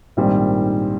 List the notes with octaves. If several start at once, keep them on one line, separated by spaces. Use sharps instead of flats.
A#1 G#2 D#3 G3 C4